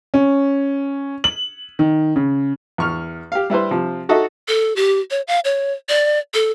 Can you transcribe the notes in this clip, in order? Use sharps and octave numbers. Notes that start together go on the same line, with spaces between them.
C#4
F#7
D#3
C#3
E2 C#6 F6
G4 F5
G3 E4 B4 C5
C3 F3
D#4 F#4 A4 D#5 E5
A4
G4
C#5
F5
C#5
D5
A4